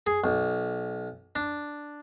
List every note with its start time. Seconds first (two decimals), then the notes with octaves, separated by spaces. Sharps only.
0.07 G#4
0.24 B1
1.35 D4